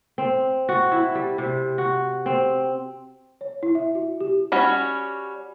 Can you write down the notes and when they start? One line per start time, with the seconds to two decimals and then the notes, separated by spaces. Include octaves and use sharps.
0.18 C4
0.69 F#4
0.91 E4
1.15 G3
1.38 C3
1.78 F#4
2.26 C4
3.41 C#5
3.63 E4
3.75 E5
3.95 F#4
4.21 G4
4.52 G3 C#4 F#4